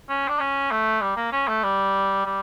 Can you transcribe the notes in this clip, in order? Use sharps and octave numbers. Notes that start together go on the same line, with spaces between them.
C#4
D4
C#4
A3
G3
A#3
C#4
A3
G3
G3